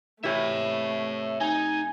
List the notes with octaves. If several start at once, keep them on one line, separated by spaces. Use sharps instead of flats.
C3 E3 A3 E4 C#5 E5
D#4 G#5